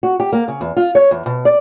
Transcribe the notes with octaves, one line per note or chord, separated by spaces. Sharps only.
F#4
G4
A#3
C#3
E2
F4
C#5
E2
B2
D5